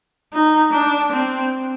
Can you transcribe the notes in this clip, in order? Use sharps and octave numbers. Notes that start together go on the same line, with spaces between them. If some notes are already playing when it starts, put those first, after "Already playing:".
D#4
D4
C4